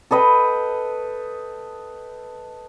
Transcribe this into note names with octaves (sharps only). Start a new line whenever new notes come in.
A4 B4 D#5 G5